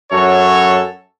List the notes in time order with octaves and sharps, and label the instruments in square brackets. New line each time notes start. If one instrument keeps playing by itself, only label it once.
[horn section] F#2 F#4 A4 C#5